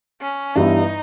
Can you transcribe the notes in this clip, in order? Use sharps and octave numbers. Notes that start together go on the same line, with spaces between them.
C#4
G2 E3 G3 B3 D#4 E4